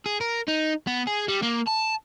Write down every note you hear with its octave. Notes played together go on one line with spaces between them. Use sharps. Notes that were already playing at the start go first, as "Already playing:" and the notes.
G#4
A#4
D#4
B3
G#4
G3
A#3
A5